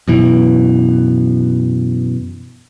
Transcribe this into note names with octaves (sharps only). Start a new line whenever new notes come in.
F#2 B2 E3